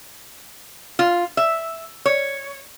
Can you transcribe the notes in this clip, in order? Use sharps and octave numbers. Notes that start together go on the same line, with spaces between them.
F4
E5
C#5